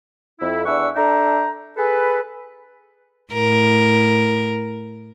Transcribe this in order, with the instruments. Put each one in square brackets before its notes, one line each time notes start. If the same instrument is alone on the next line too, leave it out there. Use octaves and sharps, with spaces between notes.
[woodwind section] F2 E4
E2 D4 E5 F#5 C#6 E6
D4 A4 E5 G5 A#5
G#4 A4 B4
[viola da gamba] A2 A#4